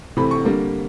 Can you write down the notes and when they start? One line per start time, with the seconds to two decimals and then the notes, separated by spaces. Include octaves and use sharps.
0.17 C3 E3 A3 B5
0.31 C#6
0.45 D3 G3 A#3